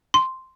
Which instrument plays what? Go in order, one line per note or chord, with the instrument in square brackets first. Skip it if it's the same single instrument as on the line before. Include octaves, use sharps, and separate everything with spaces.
[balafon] C6